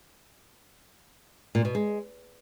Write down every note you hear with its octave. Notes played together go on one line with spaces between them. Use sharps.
A#2
B2
G#3